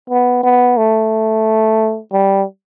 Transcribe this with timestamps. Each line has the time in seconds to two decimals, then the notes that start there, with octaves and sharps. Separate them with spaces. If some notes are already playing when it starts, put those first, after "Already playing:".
0.10 B3
0.43 B3
0.77 A3
2.13 G3